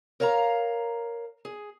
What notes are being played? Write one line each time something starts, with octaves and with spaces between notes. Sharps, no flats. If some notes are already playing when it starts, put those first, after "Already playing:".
A#4 C#5 F5 A5 A#5
G#4